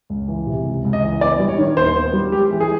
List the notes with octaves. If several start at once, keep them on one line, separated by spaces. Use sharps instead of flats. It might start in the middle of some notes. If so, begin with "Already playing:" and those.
C#2
E3
C3
C#2
C#2
D#5
E3
B3 D5
G3
C#5
D#3
D#2 C5
B3
G3
G#3 G4
E3
G#4